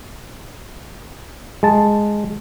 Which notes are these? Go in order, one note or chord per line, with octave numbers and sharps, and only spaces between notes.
G#3 A5